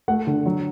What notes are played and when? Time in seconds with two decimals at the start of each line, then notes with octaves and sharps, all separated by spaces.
0.08 A3 F#5
0.27 D3
0.46 F#3